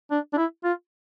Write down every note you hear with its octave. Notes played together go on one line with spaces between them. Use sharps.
D4
D4
E4
F4